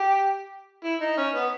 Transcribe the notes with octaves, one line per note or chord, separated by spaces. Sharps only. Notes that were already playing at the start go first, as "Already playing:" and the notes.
Already playing: G4
E4
D#4
C#4
B3